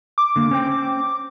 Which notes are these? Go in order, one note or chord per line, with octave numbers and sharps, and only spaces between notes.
D6
D3 A#3
C#4 C5 G5